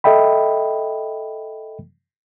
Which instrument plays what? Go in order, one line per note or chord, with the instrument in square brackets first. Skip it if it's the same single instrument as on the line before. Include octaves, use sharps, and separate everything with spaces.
[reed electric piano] A4 D#5 E5 G5 B5